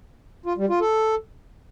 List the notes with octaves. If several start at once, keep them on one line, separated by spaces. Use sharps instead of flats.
F4
G3
F4
A4